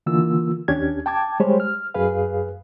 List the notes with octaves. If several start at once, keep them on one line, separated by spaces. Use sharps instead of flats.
D3 E3 A#3 F4 E6
D#2 C#4 D4 G4 G#6
G5 A5 D6 G#6
G3 G#3 G4 C5 C#5
F6
F#2 G#4 B4 F5